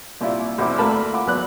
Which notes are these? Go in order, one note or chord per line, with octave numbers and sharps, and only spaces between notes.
C2 A#2 E4 F4
B1 E2 C4 E4 D6
D2 A3 A#3 A#4 A5 B5
F4 F#5 B5 D6
G#1 E2 F#3 B4 B5 F#6